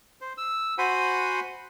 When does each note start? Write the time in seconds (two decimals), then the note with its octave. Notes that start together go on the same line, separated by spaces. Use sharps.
0.21 C5
0.38 E6
0.78 F#4 C5 F#5 G#5 B5